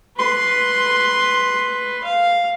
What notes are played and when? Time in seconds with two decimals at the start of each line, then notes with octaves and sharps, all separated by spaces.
0.17 B4 C6
2.04 F5